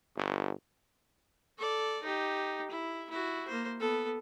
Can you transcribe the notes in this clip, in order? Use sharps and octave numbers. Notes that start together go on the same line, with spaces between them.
G1
A4 D5
D#4 G4
E4
E4 F#4
A#3 C5
B3 A4